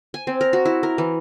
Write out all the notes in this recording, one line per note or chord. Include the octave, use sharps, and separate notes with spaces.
G#5
C4
A#4
F#4
E4
A#4
E3